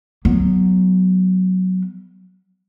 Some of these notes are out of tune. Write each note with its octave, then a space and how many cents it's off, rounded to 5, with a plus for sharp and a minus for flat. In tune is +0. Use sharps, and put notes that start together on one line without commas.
F#3 +0 B3 +0